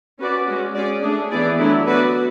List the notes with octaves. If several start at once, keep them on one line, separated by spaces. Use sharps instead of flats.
C#4 F#4 B4 D5
G#3 C#4 F#4
C#4 G#4 D5
A3 D4 G#4
E3 B3 E4 G#4 D5
D3 F#3 A3 E4
B3 F#4 B4 D5